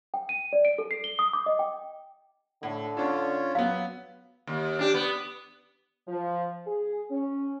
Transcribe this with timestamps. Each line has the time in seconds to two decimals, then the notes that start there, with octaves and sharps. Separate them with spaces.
0.14 G5
0.29 D#7
0.53 D5
0.65 D7
0.78 A4
0.91 C7
1.04 G7
1.19 D#6
1.33 D6
1.46 D#5
1.59 G5
2.63 A2 D3
2.97 C#4 D4 F4 A4 C#5
3.55 F#3 B3 F5
4.47 D#2
4.79 D4 G4
4.94 B3
6.07 F3
6.66 G#4
7.09 C#4